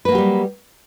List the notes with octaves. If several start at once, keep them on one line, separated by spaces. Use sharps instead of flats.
F#3 G3 A#3 G4 B4